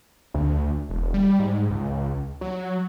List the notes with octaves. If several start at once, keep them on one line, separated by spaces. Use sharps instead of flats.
D2
E1
G3
G#2
C#2
F#3